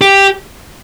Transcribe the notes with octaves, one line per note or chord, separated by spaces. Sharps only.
G4